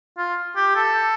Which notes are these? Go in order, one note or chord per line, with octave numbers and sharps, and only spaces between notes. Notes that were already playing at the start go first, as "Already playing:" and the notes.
F4
G4
A4